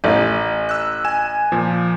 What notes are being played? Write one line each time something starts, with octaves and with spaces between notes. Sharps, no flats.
A1
E6 F#6
G#5 E7
A#2 F3